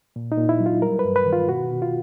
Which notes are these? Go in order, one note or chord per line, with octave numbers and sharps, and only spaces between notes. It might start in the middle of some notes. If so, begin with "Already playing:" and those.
A#2
D#4
A#2
E4
F#3
F4
G3 A#4
B4
G2
B4
D#3
F4
B2 F#4
B2
F4